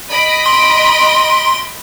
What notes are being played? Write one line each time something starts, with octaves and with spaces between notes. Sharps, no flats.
D#5 B5 D7
C6